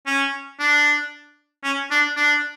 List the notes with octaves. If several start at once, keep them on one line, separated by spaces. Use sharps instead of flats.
C#4
D4
C#4
D4
D4